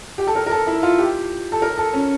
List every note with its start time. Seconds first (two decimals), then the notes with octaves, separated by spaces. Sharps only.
0.18 G4
0.27 A4
0.36 A#4
0.47 A#4
0.51 A4
0.67 E4
0.83 F4
0.98 G4
1.52 A4
1.62 A#4
1.78 A4
1.93 C#4